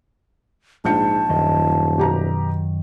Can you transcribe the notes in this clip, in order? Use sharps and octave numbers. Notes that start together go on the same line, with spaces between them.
A#1 G#2 A5 G6 C#7
D#1 F#2 D#3 D#5
B2 G4 A#5